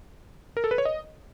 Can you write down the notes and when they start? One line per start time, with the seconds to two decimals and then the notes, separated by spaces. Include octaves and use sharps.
0.57 A#4
0.64 A4
0.71 B4
0.78 C#5
0.85 D#5